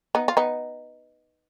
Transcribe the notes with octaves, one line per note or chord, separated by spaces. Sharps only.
B3 D#4
F4
B3 D#4